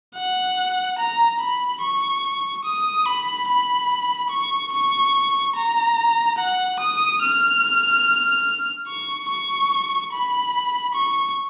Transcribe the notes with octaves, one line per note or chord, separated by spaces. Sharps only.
F#5
A#5
B5
C#6
D#6
B5
B5
C#6
C#6
A#5
F#5
D#6
F6
C#6
C#6
B5
C#6